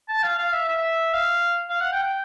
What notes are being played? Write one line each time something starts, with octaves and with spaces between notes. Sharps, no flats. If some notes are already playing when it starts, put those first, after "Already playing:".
A5
F5
F5
E5
E5
F5
F5
F#5
G5
G5